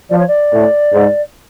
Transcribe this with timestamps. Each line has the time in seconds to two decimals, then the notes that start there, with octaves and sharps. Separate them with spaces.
0.10 F3 D5
0.19 C#5
0.28 D5
0.51 A2
0.92 G#2